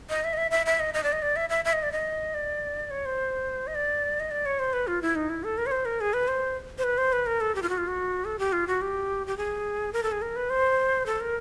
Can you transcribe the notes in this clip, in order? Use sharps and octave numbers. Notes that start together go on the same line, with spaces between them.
D#5
E5
D#5
E5
E5
E5
D#5
D#5
D5
D#5
D5
E5
E5
E5
D#5
D5
D#5
D5
C#5
C5
D#5
D5
D#5
D5
C#5
C5
B4
F4
E4
D#4
E4
A4
A#4
C#5
C5
A#4
G#4
B4
C5
C5
B4
C5
B4
A#4
A4
G4
F4
F#4
F4
F#4
A4
G4
F4
F#4
G4
G4
G#4
A#4
A4
G#4
A#4
B4
C5
A4
A#4